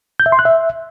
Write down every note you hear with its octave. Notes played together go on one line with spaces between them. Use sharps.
G6
E5
C6
F#6
E5